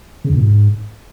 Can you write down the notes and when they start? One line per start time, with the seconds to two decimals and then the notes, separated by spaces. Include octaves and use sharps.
0.24 C#3
0.30 E2
0.35 A#2
0.40 G#2